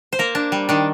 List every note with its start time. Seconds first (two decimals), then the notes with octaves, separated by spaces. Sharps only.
0.13 C5
0.19 A#3 A#4
0.35 D4
0.52 G3
0.69 D#3 D4